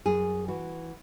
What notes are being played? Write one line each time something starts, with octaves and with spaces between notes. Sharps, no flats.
F#2 G#4
E3 F#4